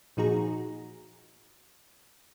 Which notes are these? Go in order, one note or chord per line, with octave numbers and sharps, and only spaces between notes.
A#2 F3 D#4 F#4 G#4 A#5